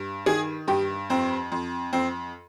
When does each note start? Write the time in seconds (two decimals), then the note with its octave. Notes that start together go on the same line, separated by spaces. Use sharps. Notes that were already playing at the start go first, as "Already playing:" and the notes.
Already playing: G2
0.26 D#3 G#4
0.68 G2 G4
1.10 F2 C4
1.52 F2
1.93 F2 C4